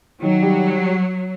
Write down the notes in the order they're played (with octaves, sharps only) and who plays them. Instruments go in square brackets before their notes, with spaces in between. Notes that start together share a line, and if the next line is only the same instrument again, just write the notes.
[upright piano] D#3 [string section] F#3
[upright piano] G3